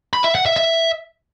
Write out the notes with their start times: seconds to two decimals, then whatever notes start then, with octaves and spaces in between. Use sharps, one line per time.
0.13 B5
0.24 E5
0.35 F#5
0.46 E5
0.56 E5